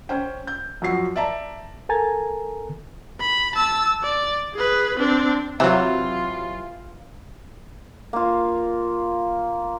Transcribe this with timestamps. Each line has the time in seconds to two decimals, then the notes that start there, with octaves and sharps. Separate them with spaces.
0.09 C#4 C5 G5
0.47 G6
0.82 F#2 F3 F#4 C7
1.16 D5 E5 A5 A#5
1.89 A4 A#4 G#5 A#5 G#6 A6
3.20 B5
3.55 A5 E6
4.03 D5
4.54 G#4 B4
4.97 C4 D4
5.60 C3 E3 F#3 F4
8.13 A#3 F4